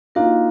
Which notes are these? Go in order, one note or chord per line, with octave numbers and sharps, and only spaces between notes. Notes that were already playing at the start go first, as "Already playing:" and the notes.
A#3 D4 D#4 F4 F#4 A#4